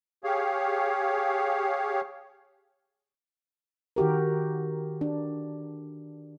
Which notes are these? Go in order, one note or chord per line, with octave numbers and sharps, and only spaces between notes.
G4 G#4 C#5 F5
D#3 F#4 G4 A#4
D4